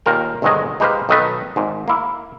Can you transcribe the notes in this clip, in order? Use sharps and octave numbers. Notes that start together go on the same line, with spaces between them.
D#2 A#2 A#4 G5
G1 D2 D#3 F#3 G#3 D#5
G#3 D#4 G4 B4 C5 F5
B1 D#3 D#4 A4 B4
G#1 G#2
A#3 E4